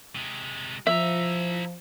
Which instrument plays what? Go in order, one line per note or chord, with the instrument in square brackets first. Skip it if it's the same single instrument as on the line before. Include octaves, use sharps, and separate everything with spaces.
[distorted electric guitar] C3 G#3
[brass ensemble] F3 [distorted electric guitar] E4 A#5 [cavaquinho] E5